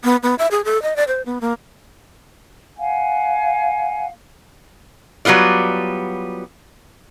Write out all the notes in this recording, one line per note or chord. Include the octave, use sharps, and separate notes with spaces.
B3
B3
E5
G#4
A4
D#5
D5
C5
B3
A#3
F5 F#5 G#5
F#3 G3 B3 F4 D5